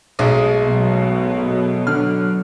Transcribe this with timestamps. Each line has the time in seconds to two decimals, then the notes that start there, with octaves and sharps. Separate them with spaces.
0.19 B1 G#3 A3
0.65 B2 F#3
1.87 D3 F6